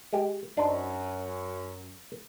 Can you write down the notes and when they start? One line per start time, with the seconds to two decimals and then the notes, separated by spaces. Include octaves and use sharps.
0.13 G#3 G4
0.57 F#2 D4 D#4 C5